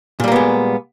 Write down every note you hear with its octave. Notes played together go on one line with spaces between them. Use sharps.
A#2 G3 G#3 A#3 B3